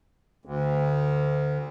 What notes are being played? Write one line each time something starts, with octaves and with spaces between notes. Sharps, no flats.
D2